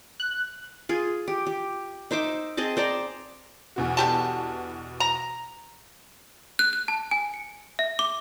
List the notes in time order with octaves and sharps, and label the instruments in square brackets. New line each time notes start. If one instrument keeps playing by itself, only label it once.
[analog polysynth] F#6
[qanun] F4 G#4
G4
G4
D#4 C5 E5 D6
C4 G#4 D#5 A5
C5 D5 A#5
[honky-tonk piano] E2 B2 F#4
[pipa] D3 G4 A5
A#5
[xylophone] F#6
F#6
A5
G#5
C#7
E5
D6